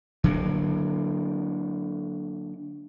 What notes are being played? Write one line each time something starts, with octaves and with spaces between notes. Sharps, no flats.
D3 F#3 G#3 A#3